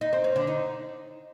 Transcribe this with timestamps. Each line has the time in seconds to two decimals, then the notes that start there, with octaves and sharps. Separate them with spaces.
0.01 D#4
0.13 C4
0.24 C#4
0.36 D3
0.47 D#4